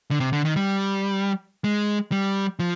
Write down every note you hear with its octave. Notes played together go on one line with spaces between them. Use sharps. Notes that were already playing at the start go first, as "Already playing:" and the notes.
D3
C3
D3
D#3
G3
G#3
G3
F3